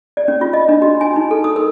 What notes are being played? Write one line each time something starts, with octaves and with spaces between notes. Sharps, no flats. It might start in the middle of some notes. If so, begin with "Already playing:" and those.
D5
C#4
F4
D#5
D4
F#4
G#5
D#4
A4
D#6
A#4